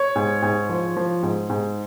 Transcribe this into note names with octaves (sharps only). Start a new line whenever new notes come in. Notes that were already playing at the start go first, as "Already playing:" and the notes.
Already playing: C#5
G#2
G#2
F3
F3
G#2
G#2